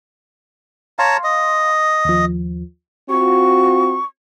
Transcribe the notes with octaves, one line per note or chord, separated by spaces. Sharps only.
C#5 F5 A5 A#5 C6
D#5
D#2 F3
C4 F4 F#4 C#6